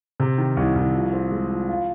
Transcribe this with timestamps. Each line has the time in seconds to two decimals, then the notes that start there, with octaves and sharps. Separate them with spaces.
0.20 C3
0.38 D#3
0.57 C2
0.76 C2
0.94 F3
1.13 C4
1.31 G#3
1.50 F3
1.69 F4